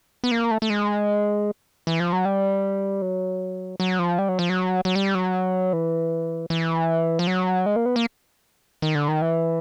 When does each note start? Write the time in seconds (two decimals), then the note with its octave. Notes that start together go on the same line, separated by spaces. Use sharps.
0.24 B3
0.31 A#3
0.51 A3
0.62 A3
0.70 G#3
1.87 E3
2.00 F3
2.13 F#3
2.25 G3
3.02 F#3
3.80 F#3
3.99 F3
4.18 G3
4.29 F#3
4.39 F3
4.50 F#3
4.85 F#3
4.96 G3
5.15 F#3
5.73 E3
6.50 E3
7.19 F3
7.27 F#3
7.66 G#3
7.76 A#3
7.86 B3
7.96 A#3
8.82 D#3
8.95 D3
9.08 D#3
9.22 E3